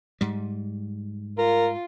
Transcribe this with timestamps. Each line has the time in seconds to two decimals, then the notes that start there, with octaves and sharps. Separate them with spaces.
0.21 G#2 G3
1.38 F4 A#4